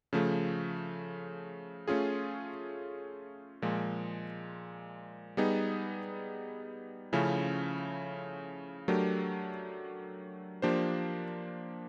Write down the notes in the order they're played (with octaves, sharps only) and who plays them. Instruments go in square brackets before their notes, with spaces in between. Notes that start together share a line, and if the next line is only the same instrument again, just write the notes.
[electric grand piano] C#3 F3 A3
A3 C#4 F4 G#4
A#2 F3 G#3
G3 B3 D#4 G#4
C#3 F3 A3 C#4 E4
F#3 A3 D4 G4 A#4
F3 A#3 D4 G4 C5